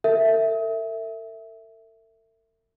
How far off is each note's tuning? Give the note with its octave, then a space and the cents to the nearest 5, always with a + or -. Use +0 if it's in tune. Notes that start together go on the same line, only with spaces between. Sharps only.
A4 +45 E5 +0